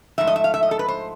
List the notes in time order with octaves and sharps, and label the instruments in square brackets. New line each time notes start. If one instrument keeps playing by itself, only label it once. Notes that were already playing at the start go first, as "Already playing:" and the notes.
[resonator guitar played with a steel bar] G#2 F3 A3 E5
D#5
E5
F5
E5
D#5
A4
B4
C5